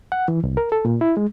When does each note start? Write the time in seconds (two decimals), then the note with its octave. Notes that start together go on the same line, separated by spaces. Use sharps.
0.12 F#5
0.28 E3
0.44 C2
0.57 A#4
0.72 A4
0.85 A#2
1.01 E4
1.17 G#3